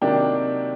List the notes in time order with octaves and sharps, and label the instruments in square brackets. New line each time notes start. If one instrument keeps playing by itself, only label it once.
[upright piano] C3 D#3 F#3 A#3 D4 G5